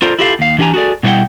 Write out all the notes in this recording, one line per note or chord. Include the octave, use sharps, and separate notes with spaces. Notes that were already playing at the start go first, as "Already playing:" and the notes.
F4 A4 A#4 C5 D5
E4 F4 G4 A4 D5 F5
D#2 F5
E3 D4 G4 E5 G#5 A#5
F#4 G#4 A4 D5
B2 G3 E4 C5 F#5 G5